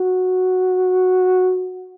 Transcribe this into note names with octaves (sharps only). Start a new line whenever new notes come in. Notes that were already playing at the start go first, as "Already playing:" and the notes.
Already playing: F#4